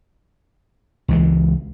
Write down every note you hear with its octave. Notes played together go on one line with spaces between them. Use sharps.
C#2 E3 G#3